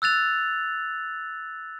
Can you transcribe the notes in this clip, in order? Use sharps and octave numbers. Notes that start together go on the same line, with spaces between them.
E6 F#6 A6 F7